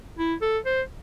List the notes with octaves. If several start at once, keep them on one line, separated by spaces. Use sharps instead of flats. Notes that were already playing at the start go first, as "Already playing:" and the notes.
E4
A4
C5